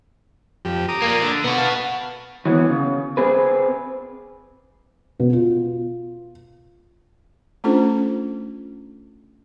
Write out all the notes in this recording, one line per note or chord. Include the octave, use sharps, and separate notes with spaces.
F2 G4
A#5 D6 D#6
A#2 A#3
D3
B2 B3 F#4
F5 A5
E3 F#3 A#3 B3
C#3
C4 G#4 B4
B2
F4
A3 C#4 D4 F4 A4 C5